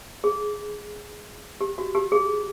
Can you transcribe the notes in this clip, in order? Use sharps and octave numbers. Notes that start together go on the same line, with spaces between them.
G#4
G4
F#4
G4
G#4